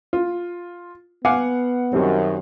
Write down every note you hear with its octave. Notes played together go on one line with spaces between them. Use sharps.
F4
B3 F5 F#5 G#5 D6
F#2 D#3 F#3 G3 C4